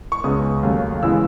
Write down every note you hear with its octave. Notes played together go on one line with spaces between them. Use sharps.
C#6
C#2 C#3 G#3 B3 D#6
D#2 C#3 F#3 A3
C#3 E3 G#3 B3 E6